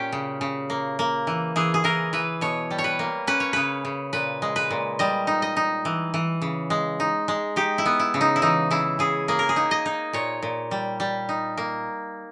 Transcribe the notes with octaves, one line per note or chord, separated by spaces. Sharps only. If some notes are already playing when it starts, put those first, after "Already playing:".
Already playing: A#2 C#4 G4
C#3
C#3
A#3
A#3
E3
E3 G#4
G#4
E3 A#4
E3 B4
B2 C#5
G3
C#5
B4
A#3
C#4 B4
C#5
C#3 B4
C#3
A#2 B4
G#3
B4
A#2
G3 D#5
D#4
D#5
D#4
E3
E3
C#3
G#3
D#4
G#3
D#4 G4
E4
B3
E4
C#3
D#4
E4
E3 D#4
C#3 E4
C#3 G#4
A#3 G#4
A#4
G#4
D#4
D#5
D#4
A#2 C#5
A#2
G3
G3
D#4
A#3